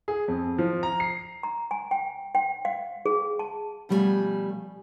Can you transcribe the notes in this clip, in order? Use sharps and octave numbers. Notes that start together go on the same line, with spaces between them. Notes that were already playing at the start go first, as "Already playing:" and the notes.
G#4
F2
F3
A#5
C7
A#5
G#5
G5
G5
F5
G#4
A5
B2 F3 G3 A3 C#5 G#5